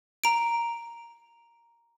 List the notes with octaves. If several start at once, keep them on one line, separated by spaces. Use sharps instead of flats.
A#5 D7